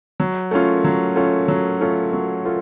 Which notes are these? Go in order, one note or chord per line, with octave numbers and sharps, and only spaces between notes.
F#3
A3 C#4 F4
F#3
A3 C#4 F4
F#3
A3 C#4 F4
F#3
A3 F4